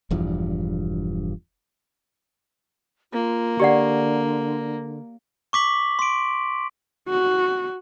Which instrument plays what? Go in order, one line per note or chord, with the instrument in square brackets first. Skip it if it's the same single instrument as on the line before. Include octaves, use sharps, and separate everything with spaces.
[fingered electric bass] E1 E2 G2 F3
[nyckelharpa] A#3 [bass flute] F4
[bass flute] D3 [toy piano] G4 D5 F#5
[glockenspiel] C#6 D6 B6 F#7
C6 D7
[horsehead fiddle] F#4